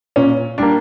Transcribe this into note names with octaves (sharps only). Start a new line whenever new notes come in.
A#2 C#4
G3 A#3 D4